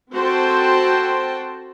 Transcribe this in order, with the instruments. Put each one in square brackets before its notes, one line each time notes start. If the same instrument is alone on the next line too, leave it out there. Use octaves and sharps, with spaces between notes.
[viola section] C4 F#4 A4 C5 G5 A5